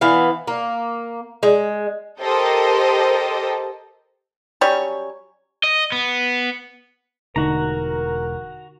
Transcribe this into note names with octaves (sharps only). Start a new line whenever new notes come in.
E3 B3 F5
A#3
G#3
G4 A4 A#4 C5 D#5
F#3 G3 C#4 C#5
D#5
B3
E1 D3 A3 D#4 F#4 A#4 A#5